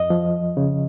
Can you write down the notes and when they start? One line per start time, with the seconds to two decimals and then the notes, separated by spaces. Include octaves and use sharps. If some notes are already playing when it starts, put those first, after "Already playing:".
Already playing: F2 D#5
0.10 F3
0.57 C#3